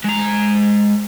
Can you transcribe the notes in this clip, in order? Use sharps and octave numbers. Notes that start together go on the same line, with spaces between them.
G#3 A#5